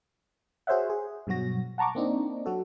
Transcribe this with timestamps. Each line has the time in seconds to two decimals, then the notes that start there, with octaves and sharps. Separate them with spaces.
0.67 F#4 G#4 C5 C#5 E5 F#5
0.90 G#4
1.27 G2 B2 F#3 F#4 A#6
1.78 F#5 A5 A#5 C#6 D6
1.95 A#3 C4 D4 D#4
2.46 F#3 F#4 A4